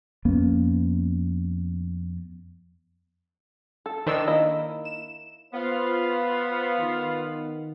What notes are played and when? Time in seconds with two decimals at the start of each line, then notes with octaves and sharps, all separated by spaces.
0.25 F2 A#3 B3 C#4
3.86 A4
4.07 D#3 D4 E4 C5 E6
4.28 A#3 E4 D#5
4.85 E7
5.53 B3 F4 C5 F5
6.79 D#3